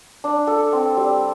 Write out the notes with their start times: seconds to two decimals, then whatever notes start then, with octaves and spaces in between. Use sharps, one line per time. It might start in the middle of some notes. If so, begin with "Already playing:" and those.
0.24 D4
0.47 A4
0.73 C4
0.97 G3